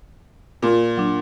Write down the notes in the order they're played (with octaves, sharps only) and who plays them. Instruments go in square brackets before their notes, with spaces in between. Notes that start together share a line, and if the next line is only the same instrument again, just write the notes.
[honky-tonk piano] A#2
[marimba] F#3 D4